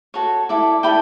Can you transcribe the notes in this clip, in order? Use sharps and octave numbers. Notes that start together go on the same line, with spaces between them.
F#4 A4 C#5
E4 A4 D5
E4 A4 G5 B5